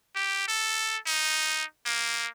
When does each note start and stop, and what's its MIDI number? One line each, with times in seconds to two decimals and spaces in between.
0.15 0.48 67
0.48 0.97 69
1.07 1.64 63
1.86 2.28 58